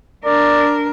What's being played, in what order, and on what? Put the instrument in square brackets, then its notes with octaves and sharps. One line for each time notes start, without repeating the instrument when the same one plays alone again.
[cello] D4 A#4 [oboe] D5